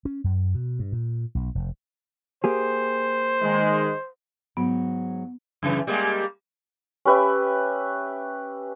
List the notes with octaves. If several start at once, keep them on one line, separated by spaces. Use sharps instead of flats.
C#4
F#2
B2
G2
A#2
B1
F1
A#3 G4 G#4 C5
D#3 G#3
G#2 F#3 B3
F#2 C#3 E3
G3 G#3 A#3
C#4 G4 B4 E5